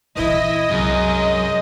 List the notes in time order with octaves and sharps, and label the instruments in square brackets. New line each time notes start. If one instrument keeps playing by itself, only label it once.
[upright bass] A#1 E3 [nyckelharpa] E4 [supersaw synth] D#5
[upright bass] C2 [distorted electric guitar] F#2 [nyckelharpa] G#3